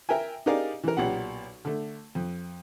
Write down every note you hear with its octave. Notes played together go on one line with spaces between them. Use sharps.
A#4 E5 G5 G#5
D#4 G4 G#4 A#4 D5 F5
E3 A#4
B1 A#2 G4 F#5
D3 A3
F2